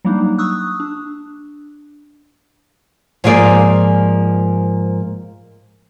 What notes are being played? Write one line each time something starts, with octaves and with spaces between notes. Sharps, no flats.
F#3 G3 A#3 D4 D#4
C#6 D#6 E6 F#6
D4
G#2 F3 A#3 F4 G#4 D5